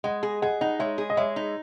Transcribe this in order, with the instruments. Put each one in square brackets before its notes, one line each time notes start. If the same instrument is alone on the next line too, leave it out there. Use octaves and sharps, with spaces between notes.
[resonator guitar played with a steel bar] G#3 [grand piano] D#5 F#5
[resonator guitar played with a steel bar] G#4
[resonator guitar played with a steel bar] G#4 [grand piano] D#5 F#5
[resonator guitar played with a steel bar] D#4 [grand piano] D#5 F#5
[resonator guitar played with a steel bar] G#3 [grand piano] C#5 E5
[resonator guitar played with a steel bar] G#4
[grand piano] D#5
[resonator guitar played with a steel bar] G#3 [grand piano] C#5 E5
[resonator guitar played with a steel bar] D#4